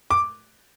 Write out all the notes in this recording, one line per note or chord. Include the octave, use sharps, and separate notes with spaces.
D6